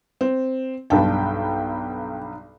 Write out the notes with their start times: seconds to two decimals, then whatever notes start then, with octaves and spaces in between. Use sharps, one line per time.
0.21 C4
0.90 B1 G2 G5 A5